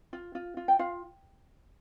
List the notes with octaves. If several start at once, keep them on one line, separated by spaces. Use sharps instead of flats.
F4
F4
F4
G5
F4 F5